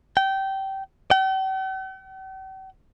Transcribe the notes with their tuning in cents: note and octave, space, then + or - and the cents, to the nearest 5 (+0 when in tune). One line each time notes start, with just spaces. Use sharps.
G5 -20
G5 -45